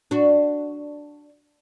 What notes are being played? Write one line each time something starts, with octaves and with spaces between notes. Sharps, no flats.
D4 F#4